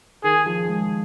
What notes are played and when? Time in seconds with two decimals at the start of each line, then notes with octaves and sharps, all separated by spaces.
0.24 D#3 G#4
0.46 F3
0.68 G#3